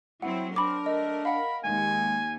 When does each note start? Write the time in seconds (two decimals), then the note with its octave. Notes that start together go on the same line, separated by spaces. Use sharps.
0.22 F#3 C4 E4 F#5
0.56 C4 D4 A#4 B5 D6
0.86 A3 D#5
1.25 F5 F#5 B5
1.64 D#2 G#3 G#5